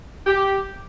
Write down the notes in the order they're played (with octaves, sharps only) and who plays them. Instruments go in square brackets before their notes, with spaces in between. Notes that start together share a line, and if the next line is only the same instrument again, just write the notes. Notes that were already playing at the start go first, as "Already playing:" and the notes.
[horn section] G4